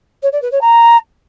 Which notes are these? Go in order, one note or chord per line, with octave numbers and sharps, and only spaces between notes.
C#5
D5
B4
C#5
A#5